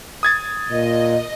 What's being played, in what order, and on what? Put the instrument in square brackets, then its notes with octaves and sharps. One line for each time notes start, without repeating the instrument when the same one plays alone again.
[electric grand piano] D#6 G#6 A6
[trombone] A#2 [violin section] D#5